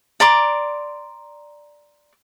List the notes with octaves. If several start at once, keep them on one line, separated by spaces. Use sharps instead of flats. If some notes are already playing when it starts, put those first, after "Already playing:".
D5 A#5 C6 D6